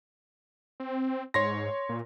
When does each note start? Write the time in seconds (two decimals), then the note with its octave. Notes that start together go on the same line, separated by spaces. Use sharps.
0.80 C4
1.34 G#2 C#5 C6 A#6
1.89 A#2